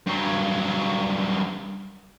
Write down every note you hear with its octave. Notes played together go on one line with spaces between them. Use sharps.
G2 F#3